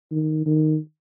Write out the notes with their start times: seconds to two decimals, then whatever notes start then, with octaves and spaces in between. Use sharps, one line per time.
0.11 D#3
0.46 D#3